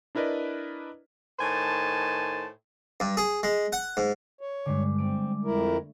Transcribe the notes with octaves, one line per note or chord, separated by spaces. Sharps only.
D4 E4 A#4 B4 D5 D#5
A2 D#3 C5 G#5 A5
G2
G#4
G#3
F#5
G#2
C#5
G2 D3 G3 G#3 D6
A3 C4 D7
F2 E4 A#4